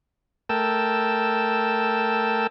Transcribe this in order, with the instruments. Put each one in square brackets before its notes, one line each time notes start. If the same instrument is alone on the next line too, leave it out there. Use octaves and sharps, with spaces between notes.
[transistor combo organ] A3 A#4 G5 A5 E6